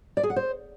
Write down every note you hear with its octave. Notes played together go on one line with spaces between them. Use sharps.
D5
G#4
F#5
C5